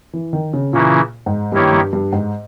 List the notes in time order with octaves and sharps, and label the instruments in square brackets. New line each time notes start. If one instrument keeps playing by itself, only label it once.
[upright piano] E3
D#3
C#3
[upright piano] A#2 [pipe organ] C#3 E3 A#3 C#4 E4
[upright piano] G#2
[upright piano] G2 [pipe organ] D#3 A#3 E4 G4 C#5
[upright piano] G2
G2
G#2